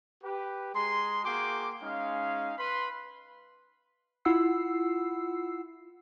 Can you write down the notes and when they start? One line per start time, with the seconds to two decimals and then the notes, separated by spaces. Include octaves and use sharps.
0.23 G4 B4
0.74 G#3 G#4 A#5 C6
1.24 A#3 F#4 G#4 G5 C6 D6
1.82 G#3 C#4 D#4 F5
2.58 B4 B5 C6
4.25 E4 F4 F#5 E6 C7